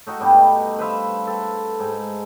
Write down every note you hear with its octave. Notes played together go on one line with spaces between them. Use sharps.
A3 D#4 F#4
G2 B2 G3 D#5
B4 C5 E5 F5
A4
G#2